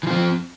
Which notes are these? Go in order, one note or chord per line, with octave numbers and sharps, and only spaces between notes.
E3 F3 C4